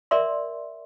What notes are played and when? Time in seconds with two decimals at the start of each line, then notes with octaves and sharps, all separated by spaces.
0.11 A#4 D5 E5 C6